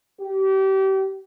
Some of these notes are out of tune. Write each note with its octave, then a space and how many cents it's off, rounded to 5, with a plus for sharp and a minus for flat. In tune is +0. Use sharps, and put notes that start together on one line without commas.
G4 -30